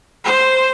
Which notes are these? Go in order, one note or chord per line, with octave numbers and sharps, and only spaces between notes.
C5